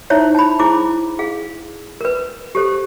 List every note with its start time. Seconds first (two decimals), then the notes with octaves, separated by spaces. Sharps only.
0.10 D#4 E4 C5 C#5 E5
0.35 A5 B5
0.59 E4 G#4 C5 D6
1.19 G#4 F5
2.01 A#4 B4
2.55 G4 A4 C5